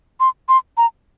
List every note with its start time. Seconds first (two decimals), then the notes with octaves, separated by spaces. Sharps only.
0.20 C6
0.49 C6
0.77 A#5